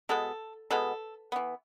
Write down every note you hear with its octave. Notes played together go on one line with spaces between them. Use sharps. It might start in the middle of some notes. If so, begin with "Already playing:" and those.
B2 G#3 B3 A4
B2 G#3 B3 A4
E3 B3